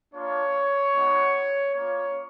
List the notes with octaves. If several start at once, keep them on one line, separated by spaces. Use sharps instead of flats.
A#3 D4 F4 C#5
G#3 B3 D#4 F#4
A#3 C#4 F4 C#5